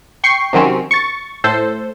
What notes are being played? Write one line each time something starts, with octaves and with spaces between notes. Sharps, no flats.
G5 C#6 C7
C3 D#3 F#3 C4 C#4
C#6 A6
A2 A4 C5